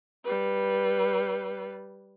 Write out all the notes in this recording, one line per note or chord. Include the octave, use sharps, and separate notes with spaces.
G3 B4